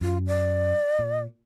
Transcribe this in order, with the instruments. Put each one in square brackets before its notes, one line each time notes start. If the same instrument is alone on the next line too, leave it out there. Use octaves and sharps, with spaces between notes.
[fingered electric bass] F#2 [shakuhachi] F4
[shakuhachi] D5
[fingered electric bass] A#2